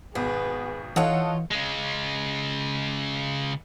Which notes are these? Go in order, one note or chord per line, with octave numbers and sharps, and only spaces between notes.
G#1 B2 B3 G#4 B4
E3 D#4 F4 A4 C#5 D#5 F5 F#5
C#3 G#3